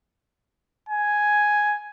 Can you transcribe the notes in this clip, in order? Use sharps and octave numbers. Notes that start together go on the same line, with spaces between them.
G#5